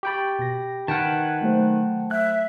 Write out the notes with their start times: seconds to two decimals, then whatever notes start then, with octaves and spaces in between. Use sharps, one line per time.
0.03 G4 G5 B5 C#6 G6 A6
0.39 B2 A#6
0.88 D#3 B4 F#5 G5 A5 F6 G#6 B6
1.41 F#3 A3 C5
2.11 E5 F#6